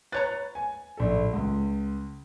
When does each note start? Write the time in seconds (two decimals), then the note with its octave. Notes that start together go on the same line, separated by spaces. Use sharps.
0.12 B4 C#5 A#5 A6
0.55 G#5
0.97 A#1 A4
1.33 C#2